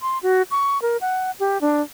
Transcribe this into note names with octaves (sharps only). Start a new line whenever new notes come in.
C6
F#4
C#6
A#4
F#5
G4
D4